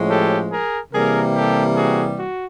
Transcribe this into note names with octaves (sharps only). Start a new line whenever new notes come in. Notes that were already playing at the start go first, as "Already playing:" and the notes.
Already playing: A2 F3 G#3 C#4
G4 A4
G#4 A#4
C3 E3 G3 A#3 G#4 A#4
G4 A4
F#4 G#4
F#4